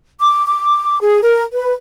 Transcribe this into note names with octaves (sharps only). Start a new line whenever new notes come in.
D6
D6
G#4
A#4
B4